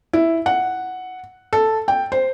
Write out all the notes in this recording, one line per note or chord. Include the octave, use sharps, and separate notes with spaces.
E4
F#5
A4
G5
C5